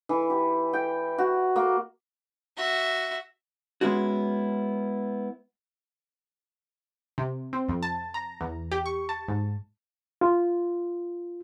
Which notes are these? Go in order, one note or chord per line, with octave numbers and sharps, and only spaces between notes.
E3
G4
G5
F#4
A#3
F#4 E5
G#3 B3 C#4 E4 F#4
C3
C4
F2
A5
A#5
E2
G4
C#6
A5
G#2
F4